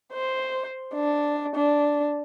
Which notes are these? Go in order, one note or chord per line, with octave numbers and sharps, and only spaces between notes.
C5
D4
D4